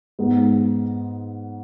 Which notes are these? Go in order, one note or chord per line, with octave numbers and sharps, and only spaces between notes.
G#2 G#3 B3